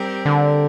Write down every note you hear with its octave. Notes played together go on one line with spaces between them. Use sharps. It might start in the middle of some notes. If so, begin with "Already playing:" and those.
Already playing: G3 C4 G4 A#4
D3